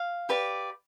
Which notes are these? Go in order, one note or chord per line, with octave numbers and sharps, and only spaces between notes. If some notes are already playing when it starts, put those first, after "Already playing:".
Already playing: F5
G4 B4 D5